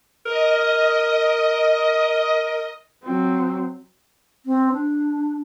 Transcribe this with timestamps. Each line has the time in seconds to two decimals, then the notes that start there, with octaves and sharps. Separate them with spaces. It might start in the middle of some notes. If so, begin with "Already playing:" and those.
0.26 A#4 D#5
3.03 F#3 C4
4.46 C4
4.73 D4